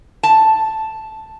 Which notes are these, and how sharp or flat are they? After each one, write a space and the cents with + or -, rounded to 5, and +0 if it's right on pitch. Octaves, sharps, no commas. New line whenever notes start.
A5 +0